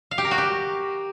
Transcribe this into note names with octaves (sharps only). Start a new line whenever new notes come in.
F5
G4
A#4
F#4
G4